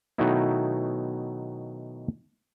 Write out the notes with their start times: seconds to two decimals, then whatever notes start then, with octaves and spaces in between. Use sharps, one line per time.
0.18 B2 D#3 F#3 A3 D#4 E4